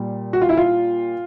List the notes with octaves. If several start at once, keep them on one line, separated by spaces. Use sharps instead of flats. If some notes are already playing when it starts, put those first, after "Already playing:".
Already playing: A#2 G3
F#4
F4
E4
F4